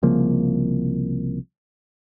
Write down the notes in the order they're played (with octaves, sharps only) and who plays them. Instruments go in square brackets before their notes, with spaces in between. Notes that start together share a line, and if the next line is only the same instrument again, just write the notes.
[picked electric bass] C2 C#3 F3 A#3